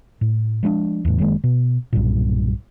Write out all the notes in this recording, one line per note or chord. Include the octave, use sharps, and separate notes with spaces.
A2
F3 G#3 C#4 D4
E2 A2
F#1 D#3 G#3 A#3
B2
B1 G2 A#2